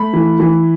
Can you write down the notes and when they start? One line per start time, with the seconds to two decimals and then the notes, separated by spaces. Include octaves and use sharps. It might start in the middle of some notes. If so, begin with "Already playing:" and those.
Already playing: A3 B5
0.13 E3
0.40 E3